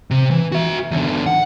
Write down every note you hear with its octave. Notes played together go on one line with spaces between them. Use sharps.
C3
E3
F#4 E5
E2 D3
F#5